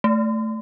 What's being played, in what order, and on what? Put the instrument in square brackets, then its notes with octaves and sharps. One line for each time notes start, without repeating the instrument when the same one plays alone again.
[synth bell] A3